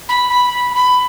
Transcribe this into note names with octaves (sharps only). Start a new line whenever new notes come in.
B5
B5
B5